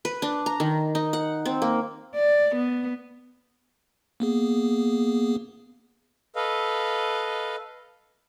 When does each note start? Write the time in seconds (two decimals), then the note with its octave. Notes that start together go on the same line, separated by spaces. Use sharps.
0.05 B4
0.22 D4
0.46 A#5
0.60 D#3
0.95 D#4
1.13 F#5
1.45 C4
1.62 A#3
2.15 D5
2.56 B3
4.20 A#3 B3 G#4
6.36 A4 B4 D#5 F5